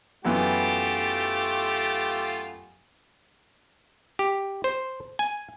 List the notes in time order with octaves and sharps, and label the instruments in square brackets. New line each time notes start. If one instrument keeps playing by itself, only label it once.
[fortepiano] F#2 E3 B3 [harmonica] A3 F4 G4
[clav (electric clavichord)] G4
C5
G#5